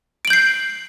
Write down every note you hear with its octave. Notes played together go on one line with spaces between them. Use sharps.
G6 C7 D7 F#7